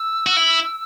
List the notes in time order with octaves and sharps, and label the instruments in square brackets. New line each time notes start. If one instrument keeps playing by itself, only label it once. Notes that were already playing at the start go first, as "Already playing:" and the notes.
Already playing: [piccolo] E6
[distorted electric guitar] F#4
E4